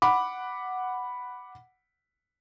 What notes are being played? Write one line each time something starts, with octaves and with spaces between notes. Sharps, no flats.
F#5 B5 D6